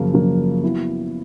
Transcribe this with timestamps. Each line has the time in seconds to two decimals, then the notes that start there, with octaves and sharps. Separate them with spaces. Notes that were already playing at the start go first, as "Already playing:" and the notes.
Already playing: F#2 C#3 F3 A#3
0.14 F#2 C#3 F3 A#3
0.63 F#3 B3 E4